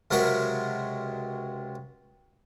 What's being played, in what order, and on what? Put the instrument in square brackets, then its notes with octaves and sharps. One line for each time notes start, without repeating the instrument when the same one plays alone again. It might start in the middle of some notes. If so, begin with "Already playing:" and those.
[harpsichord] C#2 C3 F#3 A#4 B5 C#6